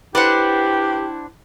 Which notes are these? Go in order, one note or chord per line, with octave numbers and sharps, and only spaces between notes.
D4 E4 G4 B4 C5 F#5